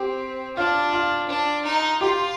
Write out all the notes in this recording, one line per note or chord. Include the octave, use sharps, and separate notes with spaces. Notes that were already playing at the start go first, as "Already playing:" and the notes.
Already playing: C4 G4
D4 F4
F4
D4
D#4
F4 G4